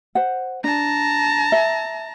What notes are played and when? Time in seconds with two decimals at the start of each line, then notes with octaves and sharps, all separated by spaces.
0.15 C5 F#5
0.64 D4 A5 A#5
1.52 E5